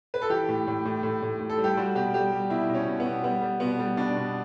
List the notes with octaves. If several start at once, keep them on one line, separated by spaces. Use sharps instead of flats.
B4
A4
E3 G4
A2
A2
A2
A2
A2
A2
A4
G3
G4
G3 F#4
B2 G4
G3 G4
G3
B2 E4
B2
C#4
B2
B3
B2
G3 B3
G3
B2 B3
G3
B2 D4
B2